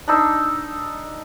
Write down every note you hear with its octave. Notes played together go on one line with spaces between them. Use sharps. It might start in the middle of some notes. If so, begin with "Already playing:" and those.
D4 D#4 E6